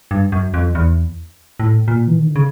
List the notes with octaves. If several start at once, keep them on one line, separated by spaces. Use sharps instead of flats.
G2
F#2
F2
E2
A2
A#2
E3
D#3
D3
C#3